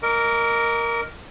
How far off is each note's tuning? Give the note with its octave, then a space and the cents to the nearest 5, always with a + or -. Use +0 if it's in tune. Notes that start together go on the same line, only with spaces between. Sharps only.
A#4 +0 D#5 +0 D6 -40